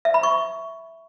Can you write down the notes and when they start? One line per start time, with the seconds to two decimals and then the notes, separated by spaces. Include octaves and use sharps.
0.05 E5
0.14 B5
0.23 C#6